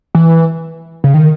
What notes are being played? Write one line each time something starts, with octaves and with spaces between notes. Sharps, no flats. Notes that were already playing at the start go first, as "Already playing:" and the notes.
E3
C#3
D#3